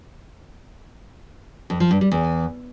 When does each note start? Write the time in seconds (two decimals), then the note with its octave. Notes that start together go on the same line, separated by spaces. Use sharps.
1.70 F2
1.80 F3
1.91 G2
2.01 G3
2.12 E2